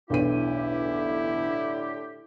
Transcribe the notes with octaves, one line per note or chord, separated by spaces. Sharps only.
B1 E2 A2 D3 D4 E4 G4 D#7